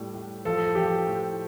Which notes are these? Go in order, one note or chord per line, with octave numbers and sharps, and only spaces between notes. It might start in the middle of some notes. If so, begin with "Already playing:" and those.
Already playing: A2 G3
A2
F3 A4
F3 G4
A2